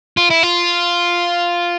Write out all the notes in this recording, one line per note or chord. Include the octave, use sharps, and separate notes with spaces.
F4
E4
F4